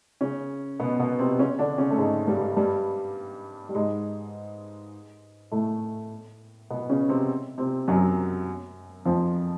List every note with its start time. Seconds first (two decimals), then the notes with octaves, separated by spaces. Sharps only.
0.21 C#3 C#4
0.80 B2 B3
0.99 B2 B3
1.19 C3 C4
1.39 C#3 C#4
1.59 D3 D4
1.78 C#3 C#4
1.90 A3
1.98 G#2 G#3
2.27 G2 G3
2.57 G2 G3
3.69 G3
3.75 G#2 G#3
5.51 A2 A3
6.70 B2 B3
6.89 C#3 C#4
7.09 C3 C4
7.58 C3 C4
7.88 F#2 F#3
9.05 F2 F3